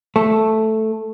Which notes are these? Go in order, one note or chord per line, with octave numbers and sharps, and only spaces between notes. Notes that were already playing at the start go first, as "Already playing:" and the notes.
A3